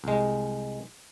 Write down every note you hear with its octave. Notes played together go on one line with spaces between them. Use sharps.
C2 G#3